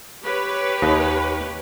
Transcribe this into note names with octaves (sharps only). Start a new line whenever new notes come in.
G4 B4 C#5
D#2 D#5